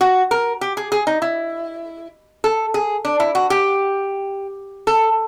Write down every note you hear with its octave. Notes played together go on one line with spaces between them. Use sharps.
F#4
A#4
G4
G#4
G#4
D#4
E4
A4
G#4
D4
E4
F#4
G4
A4